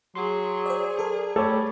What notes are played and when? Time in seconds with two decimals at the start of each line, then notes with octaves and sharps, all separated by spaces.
0.15 F#3 G#4 C6
0.66 C5 D5
0.99 A4 A#4
1.36 G3 A3 A4 C#5